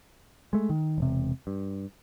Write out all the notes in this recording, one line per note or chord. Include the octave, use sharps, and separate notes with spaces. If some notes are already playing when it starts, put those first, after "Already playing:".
G#3 A3
D#3
E1 C3
G2